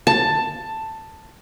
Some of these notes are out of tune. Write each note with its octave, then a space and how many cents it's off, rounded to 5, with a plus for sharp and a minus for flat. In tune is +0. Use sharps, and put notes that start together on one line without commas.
A5 +10